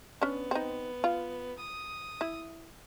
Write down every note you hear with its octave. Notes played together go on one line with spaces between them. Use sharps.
B3 C#4 D4
C4 D#4
F4
D#6
E4